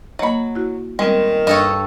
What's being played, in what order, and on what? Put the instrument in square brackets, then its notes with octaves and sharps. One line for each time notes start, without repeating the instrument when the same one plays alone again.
[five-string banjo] F#3 B5 [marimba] A#3 D#5
[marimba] E4 F#4
[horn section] A#2 D#3 [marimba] G3 B3 C4 [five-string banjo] G#3
[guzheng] G2 A4 C#5 [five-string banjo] D#5